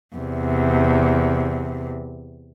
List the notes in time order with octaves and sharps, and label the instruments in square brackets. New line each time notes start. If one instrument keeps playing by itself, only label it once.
[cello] E2 C3